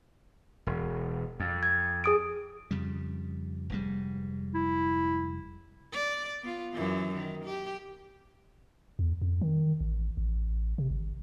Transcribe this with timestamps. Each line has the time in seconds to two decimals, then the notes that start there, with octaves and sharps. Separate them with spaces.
0.67 E1
1.40 F2
1.63 G#6
2.04 G#4 D#6 D7
2.71 F2 C#3 G3
3.70 F1 G#2 G3
4.55 E4
5.93 D5
6.42 B3 F4
6.73 F#2 E3
7.14 D#3
7.45 G4
8.99 E2
9.22 F2
9.41 D#3
9.81 A1
10.17 A1
10.78 C3
10.90 G#1